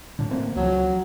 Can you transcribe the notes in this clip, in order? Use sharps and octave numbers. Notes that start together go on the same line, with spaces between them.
A2 D3
A3 A#3 C4
C#2 F3 F#3